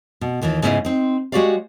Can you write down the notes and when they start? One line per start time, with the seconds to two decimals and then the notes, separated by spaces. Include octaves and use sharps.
0.21 B2
0.42 D#2 D#3 E3 F4
0.62 G#2 C#3 B3 C4 E4 D#5
0.85 C4 D#4
1.32 G#3 F#4 G4 C#5 D5 F5